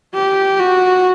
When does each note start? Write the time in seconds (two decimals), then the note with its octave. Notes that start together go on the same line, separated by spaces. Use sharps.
0.14 G4
0.60 F#4